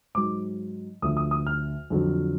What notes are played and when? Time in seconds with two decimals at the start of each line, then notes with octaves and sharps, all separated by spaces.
0.15 G#2 F#3 D6
1.02 D2 D3 F3 D#6
1.17 D#6
1.31 D#6
1.47 F6
1.90 F2 D3 F#3